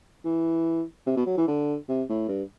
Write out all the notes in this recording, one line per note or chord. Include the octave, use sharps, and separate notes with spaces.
E3
C3
B2
F#3
E3
D3
C3
A2
G2